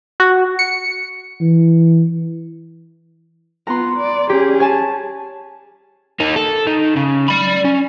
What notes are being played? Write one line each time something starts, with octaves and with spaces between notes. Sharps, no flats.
F#4
C#7
E3
B3 F4 A#5 C6
D5
C#4 G4 G#4
C#5 G#5 A5
A#3 D#4
A4
D#3
C#3
D5 B5
C#4